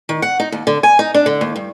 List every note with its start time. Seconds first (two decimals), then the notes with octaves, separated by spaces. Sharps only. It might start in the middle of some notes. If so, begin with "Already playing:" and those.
0.09 D#3
0.22 F#5
0.40 D#4
0.52 D#2
0.67 D3
0.83 G#5
0.99 D#4
1.14 D4
1.26 D3
1.41 D#2
1.56 G2